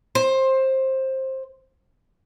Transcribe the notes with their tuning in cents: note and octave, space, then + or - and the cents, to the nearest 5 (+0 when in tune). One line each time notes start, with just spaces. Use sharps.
C5 +15